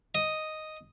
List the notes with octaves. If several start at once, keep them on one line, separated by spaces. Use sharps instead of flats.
D#5